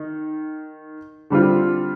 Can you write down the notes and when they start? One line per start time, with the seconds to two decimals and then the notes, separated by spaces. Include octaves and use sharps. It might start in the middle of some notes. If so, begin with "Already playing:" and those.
Already playing: D#3 D#4
1.30 D3 G3 C4 F4